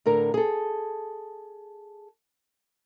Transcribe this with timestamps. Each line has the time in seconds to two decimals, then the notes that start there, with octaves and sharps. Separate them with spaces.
0.06 A2 D3 A#4 A#5
0.34 G#4 A4